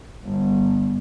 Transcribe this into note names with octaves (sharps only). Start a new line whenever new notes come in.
G1